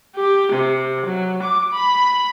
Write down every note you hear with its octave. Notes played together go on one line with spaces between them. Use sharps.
G4
C3
F#3
D6
B5